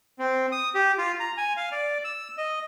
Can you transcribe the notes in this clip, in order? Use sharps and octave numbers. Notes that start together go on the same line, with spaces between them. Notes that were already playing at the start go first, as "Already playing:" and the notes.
C4
D#6
G4
F4
A#5
G#5
F5
D5
E6
D#5